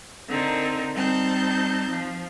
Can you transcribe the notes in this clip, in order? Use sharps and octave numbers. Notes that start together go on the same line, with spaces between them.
D3 C4 D#4 A#4
G3 C4 D#4 A5 G6
F3